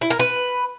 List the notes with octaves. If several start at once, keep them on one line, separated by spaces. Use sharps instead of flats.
E4
A#4
B4